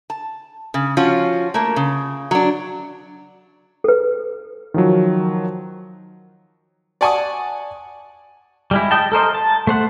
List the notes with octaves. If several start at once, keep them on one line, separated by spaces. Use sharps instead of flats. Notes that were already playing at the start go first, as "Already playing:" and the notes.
A5
C#3
F3 C#4 F4 F#4
A3 A#3
C#3
F#3 D4
A4 B4
D#3 F3 F#3
D5 F#5 G#5 A5 C#6 D#6
G3 G#3 E4
D#5 G5 A5
A4 A#4 C5 D#5
A5
A3 C5 F#5